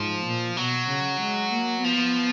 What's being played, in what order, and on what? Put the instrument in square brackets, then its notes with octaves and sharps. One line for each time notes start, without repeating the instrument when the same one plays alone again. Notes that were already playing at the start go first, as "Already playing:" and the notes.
Already playing: [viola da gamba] G#2 [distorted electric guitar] F3
[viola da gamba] A#2
[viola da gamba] B2 [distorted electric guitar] F#3
[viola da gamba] C#3
G#3
A#3
[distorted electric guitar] F3 [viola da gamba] B3